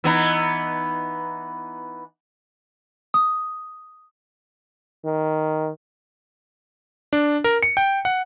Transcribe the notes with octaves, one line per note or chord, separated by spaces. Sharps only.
E3 B3 D#4
D#6
D#3
D4
A#4
C#7
G5
F#5